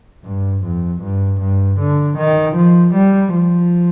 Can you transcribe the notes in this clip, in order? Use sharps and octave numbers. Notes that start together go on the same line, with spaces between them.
G2
F2
G2
G2
D3
D#3
F3
G3
F3